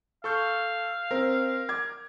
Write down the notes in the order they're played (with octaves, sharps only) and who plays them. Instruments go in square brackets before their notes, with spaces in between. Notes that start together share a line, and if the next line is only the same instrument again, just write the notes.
[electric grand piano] A4 C#6 G6 [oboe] F5
[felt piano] C4 [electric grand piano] A#4
[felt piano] D6 G#6